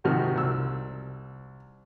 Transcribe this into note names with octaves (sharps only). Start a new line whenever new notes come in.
G#2 C3 D#3 F3 F#4 F6
C2 E6